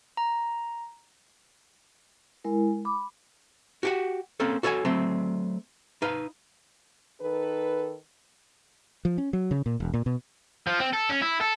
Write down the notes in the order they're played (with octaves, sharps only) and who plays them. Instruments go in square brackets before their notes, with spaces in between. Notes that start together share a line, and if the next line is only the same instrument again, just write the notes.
[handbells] A#5
[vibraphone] G#3 E4 A#4
B5 D6
[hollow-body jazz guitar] F#4 G4 F#5
A#3 C4 C#4 A4
F#4 A4 C#5 E5 G#5
F#3 A3 C4
D#4 B4 F5
[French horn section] D#3 D#4 A4 B4
[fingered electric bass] F3
C#4
F#3
C#3
A#2
E1
A#2
B2
[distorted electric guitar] F3
C4
A4
C#4
E4
A4